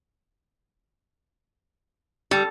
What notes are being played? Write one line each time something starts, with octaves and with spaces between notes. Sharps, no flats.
G3 A4